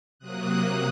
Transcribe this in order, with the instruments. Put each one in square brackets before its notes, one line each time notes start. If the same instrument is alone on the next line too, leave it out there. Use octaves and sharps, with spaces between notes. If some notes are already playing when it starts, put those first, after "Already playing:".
[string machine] C3 F#3 A#3 D#6 F#6